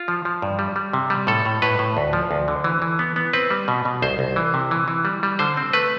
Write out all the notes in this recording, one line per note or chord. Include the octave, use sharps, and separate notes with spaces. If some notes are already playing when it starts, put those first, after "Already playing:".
Already playing: F4
F3
F3
G2
G3
G3
C3
G3
A2 A4
A2
A2 B4
A2
D2
F3
D2
D3
E3
E3
B3
B3
C4 B4
G3
B2
B2
C2 C5
C2
E3
C3
E3
E3
G3
G3
D3 C5
C4
A3 B4